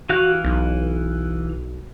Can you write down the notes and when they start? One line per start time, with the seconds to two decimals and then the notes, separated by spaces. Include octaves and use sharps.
0.09 E3 F#4 F5 F#6
0.44 B1